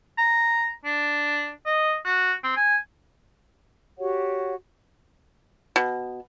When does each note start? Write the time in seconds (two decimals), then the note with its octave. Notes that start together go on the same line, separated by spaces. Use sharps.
0.18 A#5
0.85 D4
1.66 D#5
2.05 F#4
2.44 C4
2.56 G#5
3.98 F#4 G4 C#5 F#5
5.76 B2